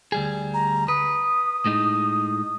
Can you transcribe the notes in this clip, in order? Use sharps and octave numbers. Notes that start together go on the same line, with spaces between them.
D2 G3 G#4
A#5
B4 D#6
A2 G#3 D#4